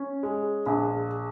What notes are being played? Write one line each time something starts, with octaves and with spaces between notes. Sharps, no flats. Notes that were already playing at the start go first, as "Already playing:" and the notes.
Already playing: C#4
G#3
A#1